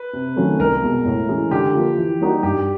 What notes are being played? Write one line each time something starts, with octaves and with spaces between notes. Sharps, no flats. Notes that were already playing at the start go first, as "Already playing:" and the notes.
Already playing: B4
C3
D#3 F#3 A3 C#4
C2 A#4
B2 G#3
A2
E3 G#3 C#4
D3 G4
F3 A#3
E3
G3 A#3 D#4 F#4
G2 G4